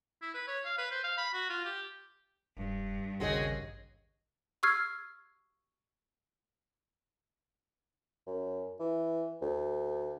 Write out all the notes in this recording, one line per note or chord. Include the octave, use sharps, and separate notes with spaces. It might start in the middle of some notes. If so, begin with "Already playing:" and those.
E4
B4
C#5
F5
B4
C5
F5
B5
F#4
F4
G4
E1 G2
A1 D#2 C#3 C4 F#4 G#4 D#5
C#6 E6 F6 G#6 C7
F#2
E3
D2